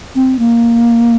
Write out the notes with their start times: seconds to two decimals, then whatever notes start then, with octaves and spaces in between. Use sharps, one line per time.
0.15 C4
0.39 A#3